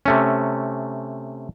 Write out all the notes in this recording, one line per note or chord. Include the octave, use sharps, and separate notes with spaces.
C3 A3 C#4